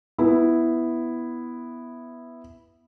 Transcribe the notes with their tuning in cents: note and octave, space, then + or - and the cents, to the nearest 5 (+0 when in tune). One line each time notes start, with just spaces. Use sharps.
B3 +0 E4 +0